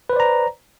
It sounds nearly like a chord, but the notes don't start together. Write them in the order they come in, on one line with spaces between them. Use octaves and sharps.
B4 C5 D5 A#5